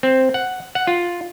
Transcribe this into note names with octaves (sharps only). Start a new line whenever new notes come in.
C4
F#5
F#5
F4